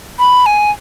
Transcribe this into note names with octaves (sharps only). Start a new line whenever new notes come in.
B5
G#5